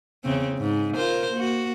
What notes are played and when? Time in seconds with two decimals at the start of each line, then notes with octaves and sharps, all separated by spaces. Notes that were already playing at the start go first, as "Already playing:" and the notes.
0.24 E2 C#3 C4
0.58 G#2
0.95 F4 A#4 C5
1.33 A#3 F#4